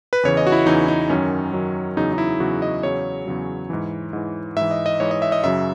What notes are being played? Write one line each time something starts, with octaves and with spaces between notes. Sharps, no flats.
B4
E2 C#3 E3 C#5
D#5
F#4
E4
E2 C#3 E3 D#4
D#4
F#2 D#3 F#3 C#4
F#2 D#3 F#3
E2 C#3 F#3 D#4
D#4
E4
E2 C#3 F#3 F#4
D#5
E2 C#3 F#3 C#5
E2 C#3 F#3
G#2 E3
G#2 E3
G#2 E3 E5
D#5
D#5
G#2 E3 C#5
D#5
E5
D#5
F#2 C#3 F#3 E5